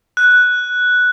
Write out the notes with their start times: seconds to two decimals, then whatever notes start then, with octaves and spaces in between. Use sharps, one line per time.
0.17 F#6